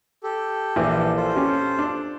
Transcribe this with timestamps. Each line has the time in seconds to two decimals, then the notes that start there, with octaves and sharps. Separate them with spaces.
0.24 G4 A4
0.76 A#1 E3
1.16 F4 A4 C5
1.36 C#4 G4
1.78 D4